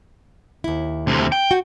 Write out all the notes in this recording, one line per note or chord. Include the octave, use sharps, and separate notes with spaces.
D#2 E4
D2 C3
G5
F#4